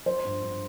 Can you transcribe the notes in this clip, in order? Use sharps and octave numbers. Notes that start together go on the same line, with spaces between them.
F3 C5
G2
G2